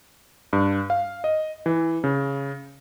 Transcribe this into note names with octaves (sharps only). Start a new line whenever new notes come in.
G2
F5
D#5
E3
C#3